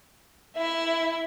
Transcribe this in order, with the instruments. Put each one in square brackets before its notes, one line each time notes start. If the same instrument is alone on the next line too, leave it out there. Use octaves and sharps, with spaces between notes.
[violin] E4 E5